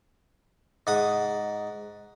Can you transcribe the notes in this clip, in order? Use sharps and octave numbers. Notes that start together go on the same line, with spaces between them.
G#2 F#5 D#6